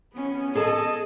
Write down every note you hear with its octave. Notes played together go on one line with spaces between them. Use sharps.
B3 C#4
G#4 A4 D#5 A5